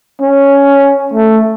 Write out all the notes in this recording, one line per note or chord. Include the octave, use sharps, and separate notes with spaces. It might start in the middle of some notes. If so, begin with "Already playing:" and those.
C#4
A3